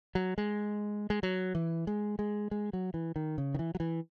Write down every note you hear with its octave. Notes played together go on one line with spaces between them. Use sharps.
F#3
G#3
G#3
F#3
E3
G#3
G#3
G#3
F#3
E3
D#3
C#3
D#3
E3
F#3
E3